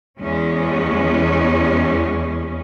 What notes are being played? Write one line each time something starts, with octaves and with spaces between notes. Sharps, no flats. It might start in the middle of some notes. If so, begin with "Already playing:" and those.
E2 G#3 C#4